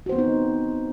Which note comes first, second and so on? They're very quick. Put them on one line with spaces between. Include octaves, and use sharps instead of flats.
F#4 C5 B3 C4 D#4